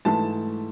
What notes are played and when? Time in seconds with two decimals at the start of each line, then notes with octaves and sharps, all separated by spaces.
0.05 G#2 E3 A3 A5